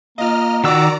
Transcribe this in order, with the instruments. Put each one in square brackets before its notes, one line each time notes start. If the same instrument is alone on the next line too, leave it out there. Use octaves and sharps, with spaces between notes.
[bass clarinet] A#3 [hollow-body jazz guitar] F4 F5 [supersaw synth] D#5 F6
[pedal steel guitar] D#3 E6 [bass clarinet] F#4 [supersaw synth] D5 A#5 D6